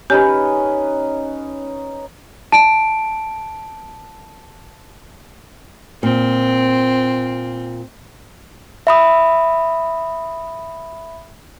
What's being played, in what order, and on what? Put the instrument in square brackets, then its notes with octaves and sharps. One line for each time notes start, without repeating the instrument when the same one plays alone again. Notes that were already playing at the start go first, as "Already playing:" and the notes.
[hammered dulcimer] C#4 D#4 B4 [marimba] G4
[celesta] A5 D7
[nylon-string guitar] A#2 [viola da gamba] C4
[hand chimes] E5 B5 D#6